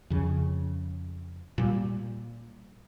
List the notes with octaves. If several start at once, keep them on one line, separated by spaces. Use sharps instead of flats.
F2 C#3
A#2 G3